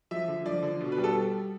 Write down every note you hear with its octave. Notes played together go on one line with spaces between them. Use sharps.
F3 E5
D3
F3 D5
D3
B2
B4
G3
A4